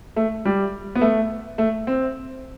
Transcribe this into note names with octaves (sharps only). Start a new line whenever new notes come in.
A3
G3
B3
A3
A3
C4